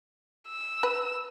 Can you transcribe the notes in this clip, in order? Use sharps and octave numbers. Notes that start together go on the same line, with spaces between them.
E6
B4